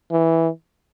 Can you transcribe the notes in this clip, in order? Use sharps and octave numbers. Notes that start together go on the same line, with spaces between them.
E3